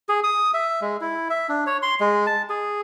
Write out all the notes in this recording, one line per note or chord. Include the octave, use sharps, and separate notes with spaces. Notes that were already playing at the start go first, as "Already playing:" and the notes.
G#4
D#6
E5
G#3
E4
E5
D4
C#5
C6
G#3
A5
G#4